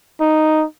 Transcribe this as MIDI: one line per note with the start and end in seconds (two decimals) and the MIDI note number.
0.20 0.65 63